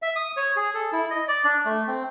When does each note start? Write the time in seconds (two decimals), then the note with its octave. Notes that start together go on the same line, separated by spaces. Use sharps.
0.02 E5
0.16 D#6
0.37 C#5
0.56 G#4
0.75 A4
0.93 E4
1.10 D#5
1.28 D5
1.45 D4
1.65 A3
1.87 C4